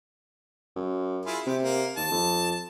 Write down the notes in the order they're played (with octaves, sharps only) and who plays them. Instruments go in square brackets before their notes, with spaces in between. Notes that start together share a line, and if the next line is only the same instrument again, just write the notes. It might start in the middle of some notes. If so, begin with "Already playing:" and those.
[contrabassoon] F#2
[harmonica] E4 F4 G#4
[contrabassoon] C3 [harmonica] G4
[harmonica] A#3
[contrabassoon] D#2 [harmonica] A5
[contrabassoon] F2